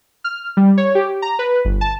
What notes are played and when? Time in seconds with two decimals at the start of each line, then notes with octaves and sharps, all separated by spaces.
0.24 F6
0.57 G3
0.78 C#5
0.95 G4
1.22 A#5
1.39 B4
1.65 G1
1.81 A5